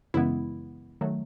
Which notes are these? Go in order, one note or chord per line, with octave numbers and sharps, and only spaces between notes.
F#2 C#3 E3 G#3 B3 E4
D#3 F#3 A3